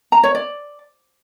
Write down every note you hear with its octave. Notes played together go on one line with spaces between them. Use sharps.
A#5
C#5
D5